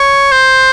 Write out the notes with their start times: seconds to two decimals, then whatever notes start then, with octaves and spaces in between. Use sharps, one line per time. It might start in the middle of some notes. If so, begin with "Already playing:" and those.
Already playing: C#5
0.32 C5